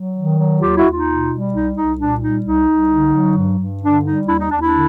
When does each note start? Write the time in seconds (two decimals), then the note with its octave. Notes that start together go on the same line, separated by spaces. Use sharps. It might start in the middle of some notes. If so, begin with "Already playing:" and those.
Already playing: F#3
0.16 D#3
0.38 F#3
0.61 D#2 F4 G4
0.76 E4 F#4
0.85 D#2
0.91 D#4 F4
1.07 B2
1.30 G3
1.53 C2 D#4
1.76 C2 D#4
1.99 A#2 D4
2.21 G3 D#4
2.44 C2 D#4
2.68 C2
2.90 D3
3.12 F#3
3.36 G2
3.58 G2
3.81 D3 D4
4.04 G3 D#4
4.27 D#2 D4 E4
4.39 D#4
4.50 D#2 D4
4.61 D4 E4
4.72 D3